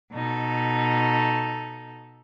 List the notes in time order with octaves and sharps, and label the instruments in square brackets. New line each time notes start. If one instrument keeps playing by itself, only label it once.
[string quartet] B2 D#4 A4